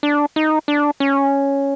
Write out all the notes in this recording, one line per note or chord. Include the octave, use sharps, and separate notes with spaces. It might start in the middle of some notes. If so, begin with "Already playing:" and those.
D4
D#4
D4
C#4